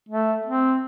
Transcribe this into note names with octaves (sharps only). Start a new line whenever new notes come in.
A3
C4